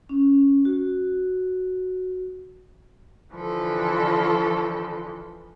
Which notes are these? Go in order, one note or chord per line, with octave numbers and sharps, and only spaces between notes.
C#4
F#4
D3 E3 F3 A4